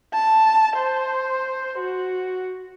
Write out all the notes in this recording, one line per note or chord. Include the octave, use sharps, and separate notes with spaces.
A5
C5
F#4